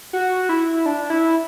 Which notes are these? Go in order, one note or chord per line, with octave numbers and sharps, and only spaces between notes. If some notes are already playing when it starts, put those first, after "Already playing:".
F#4
E4
D4
E4